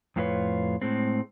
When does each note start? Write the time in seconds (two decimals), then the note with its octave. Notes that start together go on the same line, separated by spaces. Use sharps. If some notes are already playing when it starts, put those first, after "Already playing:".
0.16 F2 A2 G#3 F4 B4 C#5
0.82 A2 G#3 C4